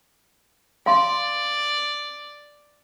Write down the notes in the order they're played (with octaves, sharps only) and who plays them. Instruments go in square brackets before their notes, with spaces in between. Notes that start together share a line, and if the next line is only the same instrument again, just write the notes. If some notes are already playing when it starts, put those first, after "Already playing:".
[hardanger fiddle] D5 [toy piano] F5 C6